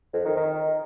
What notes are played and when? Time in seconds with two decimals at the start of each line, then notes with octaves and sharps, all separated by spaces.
0.13 F2
0.25 D#3
0.37 D#3